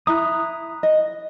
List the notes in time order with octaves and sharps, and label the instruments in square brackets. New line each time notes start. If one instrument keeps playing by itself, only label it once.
[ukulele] E4 A#5 [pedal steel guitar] D#6 F#6
[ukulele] D#5